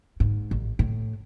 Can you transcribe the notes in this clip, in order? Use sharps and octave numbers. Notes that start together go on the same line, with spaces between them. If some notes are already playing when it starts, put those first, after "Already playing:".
G#2
A1
A2